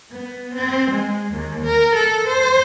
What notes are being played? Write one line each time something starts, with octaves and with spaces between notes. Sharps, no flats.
B3
C4
G#3
D#2
A#4
A4
C5